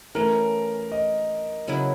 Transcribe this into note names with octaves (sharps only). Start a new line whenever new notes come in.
E3 A3 C#4 A#4
D#5
C#3 F#3 B3 E4